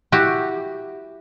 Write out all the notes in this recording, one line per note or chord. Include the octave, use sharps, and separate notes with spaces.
E4 F#4 G4